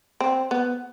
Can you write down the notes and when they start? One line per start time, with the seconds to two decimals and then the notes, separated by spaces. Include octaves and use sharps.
0.20 C4
0.51 B3